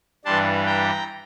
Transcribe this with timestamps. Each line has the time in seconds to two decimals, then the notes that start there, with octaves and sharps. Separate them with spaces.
0.25 G2 E3 G3 D4 A5 C6
0.66 G5 A#5